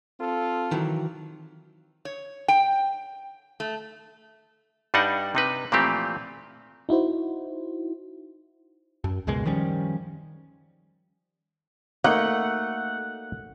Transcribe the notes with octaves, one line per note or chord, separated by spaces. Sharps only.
C4 F4 A4
D#3 E3 F#3
C#5
G5
A3
G2 G3 D4 D#4 F#5
C3 D#4 B4
A#2 E3 F3 A3 C4 G4
D#4 E4 F#4 C5
F#2
C#2 F#2 B2 G#3
D#3 F3 G3 C#4
A3 A#3 D#4 F#5